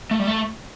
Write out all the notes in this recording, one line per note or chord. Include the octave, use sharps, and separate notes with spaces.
A3
G3
A3